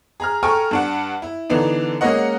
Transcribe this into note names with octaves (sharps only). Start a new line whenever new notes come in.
G#4 A#5 F6
A4 G5 G#5 A#5 C#6 F6
G2 D4 F#5
E4
D3 E3 B3 D4 D#4
G#3 A#3 C#4 A#4 D#5 F#5